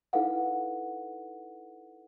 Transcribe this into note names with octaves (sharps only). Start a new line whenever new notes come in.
D#4 E4 A4 B4 F5 F#5